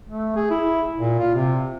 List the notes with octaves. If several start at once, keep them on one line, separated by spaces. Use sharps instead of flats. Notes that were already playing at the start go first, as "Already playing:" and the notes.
A3
G#4
E4
A#2
F4
C3